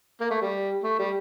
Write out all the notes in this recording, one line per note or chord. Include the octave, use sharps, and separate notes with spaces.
A#3
A3
G3
A3
G3